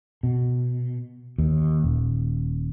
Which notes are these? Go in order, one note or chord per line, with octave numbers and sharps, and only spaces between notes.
B2
D#2
D#1